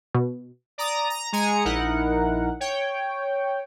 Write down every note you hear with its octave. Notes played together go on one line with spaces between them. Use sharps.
B2
D5 A#5 D#6
A#5
G#3 G#4 G#5 A#5 C#7
A#1 D#4 E4 A#4 F#5
C#5 G5